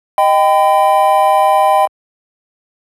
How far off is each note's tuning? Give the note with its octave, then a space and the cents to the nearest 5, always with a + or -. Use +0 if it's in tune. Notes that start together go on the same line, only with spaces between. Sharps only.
D#5 +0 G5 +0 B5 +40